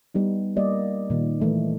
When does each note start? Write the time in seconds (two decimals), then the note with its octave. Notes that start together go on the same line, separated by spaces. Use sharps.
0.14 G3 B3 D#4
0.56 G3 A#3 D5 D#5
1.10 A#2 D#3
1.40 E3 A3 D#4